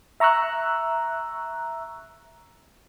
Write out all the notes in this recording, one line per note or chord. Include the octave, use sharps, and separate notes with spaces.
E5 A#5 C#6 E6 F#6